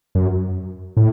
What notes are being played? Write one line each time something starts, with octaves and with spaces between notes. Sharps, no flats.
F#2
A2